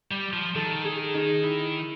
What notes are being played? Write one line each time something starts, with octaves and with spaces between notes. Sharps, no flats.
G3
F3
D#3 A4
G#4
D#4
E4